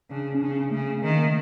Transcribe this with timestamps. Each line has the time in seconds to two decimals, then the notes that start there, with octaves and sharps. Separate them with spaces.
0.10 C#3 D4
0.34 C#4
0.41 C#3 D4
0.71 C#3 A3
1.02 D#3 A3
1.14 A#3
1.26 A3